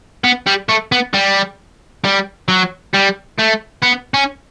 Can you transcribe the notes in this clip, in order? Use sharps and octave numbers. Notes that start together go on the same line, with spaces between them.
B3
G3
A3
B3
G3
G3
F#3
G3
A3
B3
C#4